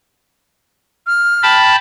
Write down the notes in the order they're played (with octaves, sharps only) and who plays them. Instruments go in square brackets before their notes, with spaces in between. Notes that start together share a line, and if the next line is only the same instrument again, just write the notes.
[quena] F6
[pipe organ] G5 A5 B5